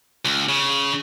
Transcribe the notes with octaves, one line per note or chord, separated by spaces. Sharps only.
C#2
C#3